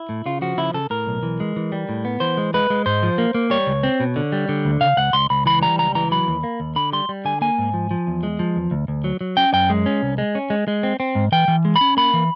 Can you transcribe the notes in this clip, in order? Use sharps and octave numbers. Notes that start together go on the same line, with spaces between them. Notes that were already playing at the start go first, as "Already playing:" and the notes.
Already playing: E4
A2
C#3 F4
F3 F#4
C#3 E4
C#3 A4
A2 A#4
B1
E3
G#3
E3
G3
A2
B3
E3 C5
G#3
G#3 B4
G#3
G#2 C5
F3
A#3
A#3
G3 C#5
C#2
C4
B2
D3
G3
D3
D2
C#3 F5
C#2 F#5
C#2 C6
C#2 B5
E3 B5
G3 A#5
C#2 A#5
E3 A#5
F#3 B5
D#2
A#3
D#2
D3 B5
G3 C6
G3
D3 G#5
A#3 G#5
G#2
F3
F3
E2
G#3
F3
E2
D2
D2
F#3
F#3
C#4 G5
F#2 G5
G#3
C#4
C2
G#3
C#4
G#3
G#3
C4
C4
G#2
E3 G5
E3
G#3
B5
C#4
A#3 B5
E3